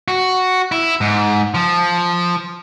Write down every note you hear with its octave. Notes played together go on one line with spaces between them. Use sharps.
F#4
E4
G#2
F3